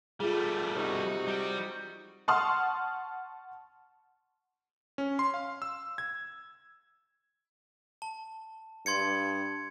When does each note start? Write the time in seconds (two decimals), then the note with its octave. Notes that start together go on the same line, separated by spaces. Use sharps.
0.20 G3 A3 F4 G#4
0.76 C3 D#4 F#4
1.27 G3
2.28 F#5 A5 C6 C#6 D#6 F6
4.98 C#4
5.19 C6
5.34 F5
5.62 E6
5.98 G#6
8.02 A5
8.86 G2 C6 G#6 C#7